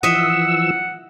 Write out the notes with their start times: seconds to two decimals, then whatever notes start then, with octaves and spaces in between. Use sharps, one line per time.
0.03 E3 F3 D#5 E5 F#5 E6